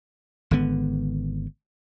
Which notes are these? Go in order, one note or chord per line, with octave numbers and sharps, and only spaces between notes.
G#1 D3 B3